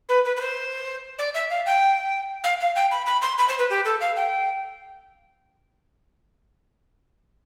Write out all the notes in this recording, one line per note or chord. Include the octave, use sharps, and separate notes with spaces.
B4
B4
B4
C5
D5
E5
F5
G5
F5
F5
G5
B5
B5
C6
B5
C5
B4
G4
A4
F5
G5